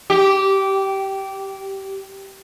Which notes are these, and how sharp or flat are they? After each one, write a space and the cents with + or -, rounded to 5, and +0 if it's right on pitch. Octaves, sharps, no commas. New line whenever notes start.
G4 -15